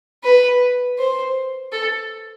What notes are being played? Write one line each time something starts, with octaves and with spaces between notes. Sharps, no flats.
B4
C5
A4